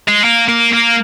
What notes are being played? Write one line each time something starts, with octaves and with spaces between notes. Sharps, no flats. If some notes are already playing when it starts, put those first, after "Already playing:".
G#3
A#3
A#3
A#3